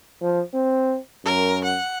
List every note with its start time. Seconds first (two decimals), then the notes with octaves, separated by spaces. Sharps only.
0.22 F3
0.54 C4
1.25 F#2 A#4
1.65 F#5